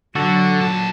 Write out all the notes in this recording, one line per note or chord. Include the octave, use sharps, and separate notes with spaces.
D3 F#3 F#4 A4
A#2 A5